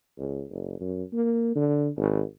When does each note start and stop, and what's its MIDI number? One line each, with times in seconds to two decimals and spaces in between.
0.18 0.44 37
0.50 0.78 30
0.81 1.03 42
1.13 1.55 58
1.55 1.89 50
1.97 2.22 32